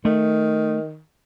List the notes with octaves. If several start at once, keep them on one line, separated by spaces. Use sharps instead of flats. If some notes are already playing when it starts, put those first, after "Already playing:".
D#3 A3